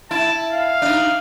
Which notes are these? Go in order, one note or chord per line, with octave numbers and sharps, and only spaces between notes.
E4 A5
F5
D4 D#4